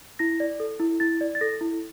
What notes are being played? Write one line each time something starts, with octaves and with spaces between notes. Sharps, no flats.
E4 A#6
D5
A4
E4
E4 A6
D5
A6
A4 A#6
E4